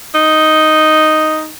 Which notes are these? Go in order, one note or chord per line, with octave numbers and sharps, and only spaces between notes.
D#4